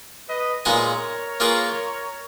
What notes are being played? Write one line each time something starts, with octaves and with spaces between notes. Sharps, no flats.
B4 D#5
A#2 G#3 B3 D#4 G#4 A#4 C#5
A#3 F4 G#4 B4